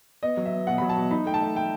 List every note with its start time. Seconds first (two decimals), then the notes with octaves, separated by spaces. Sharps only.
0.23 B3 D#5
0.37 F#3
0.46 E5
0.52 B3
0.67 B2 F#5
0.78 F#3 B5
0.89 A5
0.97 B2
1.11 D#4 B5
1.26 A3 G5
1.34 A5
1.41 A3
1.55 A3 G5